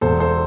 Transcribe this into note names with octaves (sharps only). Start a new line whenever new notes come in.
E1 A4 C5
A4 C5